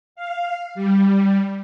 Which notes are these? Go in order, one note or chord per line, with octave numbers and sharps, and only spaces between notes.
F5
G3